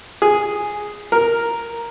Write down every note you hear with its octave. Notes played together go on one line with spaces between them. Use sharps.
G#4
A#4